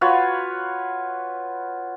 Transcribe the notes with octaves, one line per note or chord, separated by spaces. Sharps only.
F4 F#4 B4 C#5